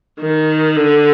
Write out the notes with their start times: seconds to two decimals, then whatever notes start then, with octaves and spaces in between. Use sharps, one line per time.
0.21 D#3
0.76 D3